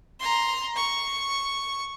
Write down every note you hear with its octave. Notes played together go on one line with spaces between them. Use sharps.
A#5 C6
C#6